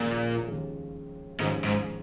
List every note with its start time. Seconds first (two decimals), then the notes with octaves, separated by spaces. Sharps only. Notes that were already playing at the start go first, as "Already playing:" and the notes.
Already playing: D#2 A#2 C#3 F3 G#3
0.47 D#2 C#3 F3 G#3
1.40 D#2 G#2 C#3 F3 G#3
1.64 G#2